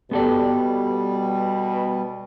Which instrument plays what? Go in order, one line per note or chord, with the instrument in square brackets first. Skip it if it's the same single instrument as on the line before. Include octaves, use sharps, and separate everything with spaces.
[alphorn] B2 [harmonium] G3 [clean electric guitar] B3 A4 D5